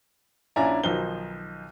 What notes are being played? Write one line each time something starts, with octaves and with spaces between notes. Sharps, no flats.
A#1 C#4 D4 E4 G#5 A#5
B1 D#3 F3 D#4 C5 G7